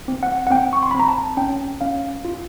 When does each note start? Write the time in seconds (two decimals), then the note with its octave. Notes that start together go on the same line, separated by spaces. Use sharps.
0.08 C4
0.23 F#5
0.47 F#5
0.50 C4 G5
0.73 C#6
0.83 C6
0.91 C4 B5
1.00 A#5
1.08 A5
1.37 C#4 G5
1.81 C#4 F5
2.25 F4